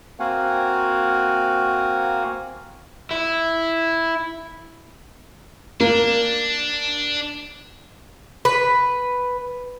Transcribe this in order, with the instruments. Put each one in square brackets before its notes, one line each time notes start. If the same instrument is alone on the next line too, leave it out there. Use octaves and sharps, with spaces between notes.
[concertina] A#3 C4 F#4 F5 F#5 G#5
[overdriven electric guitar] E4
[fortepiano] A#3 [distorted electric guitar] D4
[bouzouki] B4